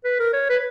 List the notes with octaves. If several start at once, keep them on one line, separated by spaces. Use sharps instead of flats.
B4
A#4
C#5
B4